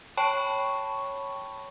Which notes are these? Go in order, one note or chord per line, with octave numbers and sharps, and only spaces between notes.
C#5 G5 A5 B5 C#6